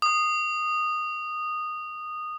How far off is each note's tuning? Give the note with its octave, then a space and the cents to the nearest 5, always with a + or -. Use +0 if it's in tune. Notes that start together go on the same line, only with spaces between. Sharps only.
D#6 -15